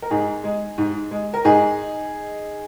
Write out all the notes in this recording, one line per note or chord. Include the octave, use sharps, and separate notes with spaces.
A#4
G#2 D#4 G#4
G#3
G#2
G#3
A#4
G#2 D#4 G#4